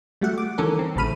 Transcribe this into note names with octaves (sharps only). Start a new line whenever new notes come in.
G3 A3 F#4 F#5
D6
D#3 E3 C#4 A4 A#4
C4
A1 A2 C#3 B5 F6 D#7